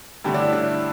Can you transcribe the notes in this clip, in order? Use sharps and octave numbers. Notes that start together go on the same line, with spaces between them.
G2 D3 A3 G4
D4
E4
D4